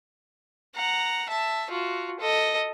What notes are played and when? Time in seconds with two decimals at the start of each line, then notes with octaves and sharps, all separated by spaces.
0.76 F#5 A#5
1.30 E5 A5
1.72 F4 F#4
2.20 A4 D#5